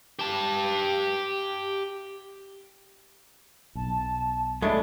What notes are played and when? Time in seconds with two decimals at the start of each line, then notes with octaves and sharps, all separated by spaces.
0.19 G4 A5
3.75 B1 A5
4.62 G#3 A3 D4 B5